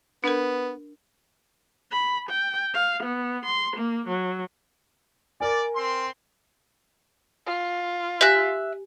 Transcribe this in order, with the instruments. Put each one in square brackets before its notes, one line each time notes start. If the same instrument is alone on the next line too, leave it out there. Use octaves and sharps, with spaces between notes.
[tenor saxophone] B3 [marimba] D4 A#4
[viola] B5
G5
F5
B3
C6
A#3
F#3
[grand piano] A#4 G#5 [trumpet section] D5
[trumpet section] C4 C6
[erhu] F4
[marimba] G4 G#5 A#6 [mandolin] E5 F#6